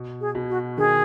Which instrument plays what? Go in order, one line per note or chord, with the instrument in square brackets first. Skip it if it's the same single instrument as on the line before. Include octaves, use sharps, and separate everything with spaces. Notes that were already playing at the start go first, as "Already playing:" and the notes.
Already playing: [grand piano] B2
[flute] G#4
[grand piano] B2
[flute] F#4
[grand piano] D#3 [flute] G#4